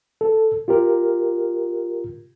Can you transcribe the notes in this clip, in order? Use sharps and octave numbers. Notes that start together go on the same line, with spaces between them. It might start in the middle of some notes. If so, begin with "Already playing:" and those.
A4
F4 G4 A#4